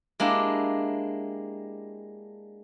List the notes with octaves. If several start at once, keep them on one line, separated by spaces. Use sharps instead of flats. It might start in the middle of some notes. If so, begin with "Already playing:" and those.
G#3 A#3 D4 E4 G4